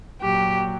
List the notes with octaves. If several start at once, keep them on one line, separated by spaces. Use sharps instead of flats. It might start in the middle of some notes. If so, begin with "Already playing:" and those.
A#2 F#3 G4